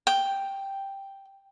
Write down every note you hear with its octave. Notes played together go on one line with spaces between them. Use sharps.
G5